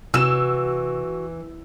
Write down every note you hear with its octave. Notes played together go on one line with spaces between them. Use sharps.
C3 E3 F#4 E6 E7